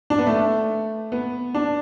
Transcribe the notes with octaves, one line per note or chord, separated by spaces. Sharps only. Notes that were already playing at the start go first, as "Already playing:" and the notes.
D4
B3
A3
B3
D4